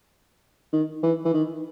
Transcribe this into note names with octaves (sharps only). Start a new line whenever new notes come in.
D#3
E3
E3
D#3